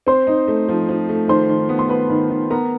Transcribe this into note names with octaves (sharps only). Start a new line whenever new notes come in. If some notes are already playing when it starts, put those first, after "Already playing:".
C4 C5 C6
D#4
A3
F3
F3
A3
D#3 C5 C6
D#3
B3
C6
B3 B4 B5
D#3
D#3
B3 A#4 A#5